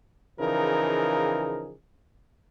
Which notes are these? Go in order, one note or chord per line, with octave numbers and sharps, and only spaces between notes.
C#3 E3 F3 D#4 G#4 A#4